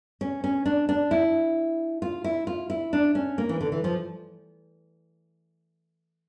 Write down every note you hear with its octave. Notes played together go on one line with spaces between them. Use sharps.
C#4
C#4
D4
D4
E4
F4
E4
F4
E4
D4
C#4
A#3
E3
D3
E3
F3